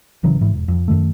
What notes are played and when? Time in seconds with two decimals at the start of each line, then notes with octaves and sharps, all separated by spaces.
0.23 G#1 C#3 E3 F#3
0.41 G#1 G#2 E3
0.54 E1
0.68 F2
0.88 F#2 D#3 A3